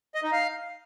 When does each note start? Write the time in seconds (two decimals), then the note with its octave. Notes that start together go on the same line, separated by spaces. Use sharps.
0.15 D#5
0.23 D#4
0.32 F5